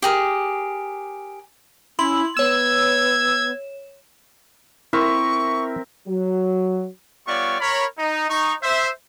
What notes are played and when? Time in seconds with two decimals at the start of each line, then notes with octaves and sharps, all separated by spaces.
0.02 G4 G#4 A#4
1.99 C#4 E4 C6 F#7
2.37 B3 C#5 E6 G#6 E7
4.93 C4 E4 A#4 E5 C#6
6.08 F#3
7.27 G3 B3 F4 C#5 D5 C#6
7.61 A#4 C#5 B5
7.98 D#4
8.30 D#4 C#6
8.63 C5 E5